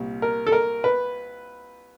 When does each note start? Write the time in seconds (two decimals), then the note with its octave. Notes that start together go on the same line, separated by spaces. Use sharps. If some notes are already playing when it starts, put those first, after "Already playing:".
Already playing: C2 A#2
0.22 A#4
0.47 A4
0.52 A#4
0.84 B4